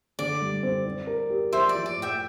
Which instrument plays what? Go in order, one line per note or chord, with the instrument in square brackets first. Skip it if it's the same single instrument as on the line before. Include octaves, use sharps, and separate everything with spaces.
[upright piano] D3 [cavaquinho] D5
[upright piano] G3
C4
C4
A#4
G4
[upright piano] F3 [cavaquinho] C5 E5
[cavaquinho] D5
[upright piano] F3
[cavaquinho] D5
[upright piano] A2
[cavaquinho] E5 G5